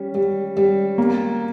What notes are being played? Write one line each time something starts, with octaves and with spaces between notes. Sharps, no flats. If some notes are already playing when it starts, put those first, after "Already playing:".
Already playing: G3 C#4
G3
G3
A#3